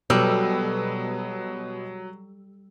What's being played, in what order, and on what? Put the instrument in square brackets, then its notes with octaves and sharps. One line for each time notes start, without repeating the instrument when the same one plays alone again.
[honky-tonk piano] B2 B4 E6 [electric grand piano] F#3 [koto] G3 [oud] A4